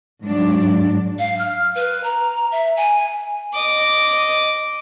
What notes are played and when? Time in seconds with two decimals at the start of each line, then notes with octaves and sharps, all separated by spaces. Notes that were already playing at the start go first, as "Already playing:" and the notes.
0.23 G#2 F#3 D4
1.19 F5
1.39 F6
1.75 B4
2.04 A#5
2.52 E5
2.77 G#5
3.54 D#5 D6